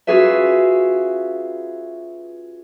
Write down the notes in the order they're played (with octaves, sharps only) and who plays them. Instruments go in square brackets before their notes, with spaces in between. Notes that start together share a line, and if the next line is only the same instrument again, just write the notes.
[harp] C#4 F4 F#4 G#4 B4 E5